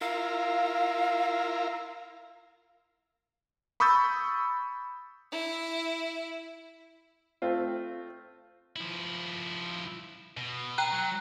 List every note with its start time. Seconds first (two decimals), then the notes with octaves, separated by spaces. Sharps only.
0.01 E4 F4 A#4 F5
3.80 B5 C#6 D#6 E6 G6 A6
5.32 E4
7.42 A3 C4 F4
8.76 F3 E4
10.37 B2
10.78 G5 A#5 F#6
10.92 F#3